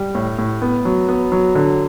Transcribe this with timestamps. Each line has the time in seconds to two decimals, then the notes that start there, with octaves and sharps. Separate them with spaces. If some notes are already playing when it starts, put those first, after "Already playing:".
Already playing: G3
0.15 A2
0.38 A2
0.62 B3
0.85 F#3
1.09 B3
1.32 F#3
1.55 D3